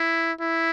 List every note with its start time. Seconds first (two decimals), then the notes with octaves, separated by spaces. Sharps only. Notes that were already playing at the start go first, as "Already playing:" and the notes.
Already playing: E4
0.41 E4